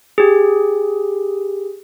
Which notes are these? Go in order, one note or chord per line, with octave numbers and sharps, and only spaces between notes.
G4 G#4